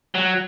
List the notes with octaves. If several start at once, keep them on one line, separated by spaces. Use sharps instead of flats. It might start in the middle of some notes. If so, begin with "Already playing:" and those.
F#3